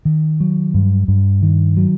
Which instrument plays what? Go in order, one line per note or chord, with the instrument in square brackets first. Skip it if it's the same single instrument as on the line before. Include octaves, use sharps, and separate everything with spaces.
[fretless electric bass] D#3
F#3
G2
G2
D#3
F#3